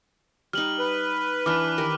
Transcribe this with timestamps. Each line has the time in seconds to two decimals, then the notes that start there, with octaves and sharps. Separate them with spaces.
0.53 G3 D#4 F6 F#7
0.79 B4
1.46 E3 D4 D6 F6
1.78 D#3 G4 A#4